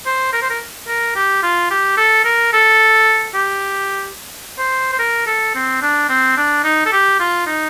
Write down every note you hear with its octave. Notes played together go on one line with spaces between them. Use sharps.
C5
A#4
C5
A#4
A#4
G4
F4
G4
A4
A#4
A4
G4
C5
C5
A#4
A4
C4
D4
C4
D4
D#4
A4
G4
F4
D#4